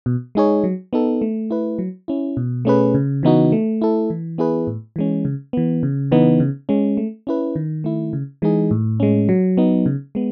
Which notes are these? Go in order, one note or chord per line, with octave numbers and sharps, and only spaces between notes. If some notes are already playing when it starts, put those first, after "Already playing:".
B2
G#3 D#4 G#4 C#5
F#3
B3 D#4 A4
A3
E4 B4
F#3
C#4 E4
B2
A3 C#4 G#4 B4
C#3
E3 B3 D#4 F#4
A3
E4 A4
E3
B3 E4 G#4 B4
A2
E3 G#3 C#4
C#3
E3 B3
C#3
E3 B3 D#4
C#3
G#3 C#4
A3
C#4 E4 B4
D#3
A3 E4
C#3
E3 G#3 D#4 G#4
A2
G#3 C#4
F#3
B3 D#4
C#3
G#3 B3